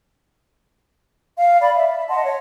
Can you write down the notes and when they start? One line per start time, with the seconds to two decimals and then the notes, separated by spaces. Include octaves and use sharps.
1.38 F5
1.60 D5 B5
1.76 E5
2.09 D#5 F#5 A5 C6
2.25 C#5